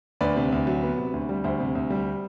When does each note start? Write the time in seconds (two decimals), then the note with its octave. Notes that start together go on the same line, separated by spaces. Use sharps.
0.21 D2 B4 D5
0.36 C3
0.52 D2
0.67 F#3
0.83 B3
0.98 C3
1.14 D2
1.29 G3
1.44 D2 C5 E5
1.60 C3
1.75 D2
1.90 G3